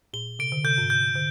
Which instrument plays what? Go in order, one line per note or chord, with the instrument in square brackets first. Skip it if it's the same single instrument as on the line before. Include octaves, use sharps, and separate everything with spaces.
[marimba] A#2 [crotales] G7
[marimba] C3 [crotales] D7
[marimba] D3
[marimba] C3 [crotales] G6
[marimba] G#2
[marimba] C3 [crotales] G6
[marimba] D3